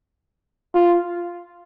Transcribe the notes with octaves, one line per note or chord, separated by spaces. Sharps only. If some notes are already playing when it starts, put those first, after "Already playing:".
F4